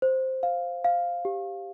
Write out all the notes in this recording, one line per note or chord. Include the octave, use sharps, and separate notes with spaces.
C5
F5
F5
G4